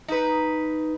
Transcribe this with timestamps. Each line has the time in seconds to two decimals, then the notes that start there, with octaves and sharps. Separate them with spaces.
0.08 D#4 B4